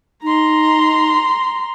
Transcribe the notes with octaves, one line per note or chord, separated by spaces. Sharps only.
D#4 A#5 C6